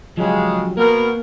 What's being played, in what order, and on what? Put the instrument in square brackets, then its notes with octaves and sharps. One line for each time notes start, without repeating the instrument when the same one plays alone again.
[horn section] C#3 G#3 [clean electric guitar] F3 F#3 G4
[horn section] B2 B3 A#4 [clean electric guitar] A#3